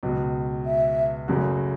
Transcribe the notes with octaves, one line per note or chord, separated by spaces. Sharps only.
C#2 B2 F#3
E5
F#1 F#2 C#3 A3 F#4